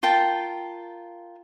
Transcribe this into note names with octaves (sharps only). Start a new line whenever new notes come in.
F4 A#4 G5 A5